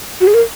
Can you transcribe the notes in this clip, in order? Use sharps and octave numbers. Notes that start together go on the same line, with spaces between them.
F#4
G#4
A#4